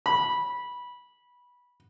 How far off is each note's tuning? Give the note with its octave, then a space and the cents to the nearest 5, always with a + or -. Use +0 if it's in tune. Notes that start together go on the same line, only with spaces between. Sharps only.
B5 -15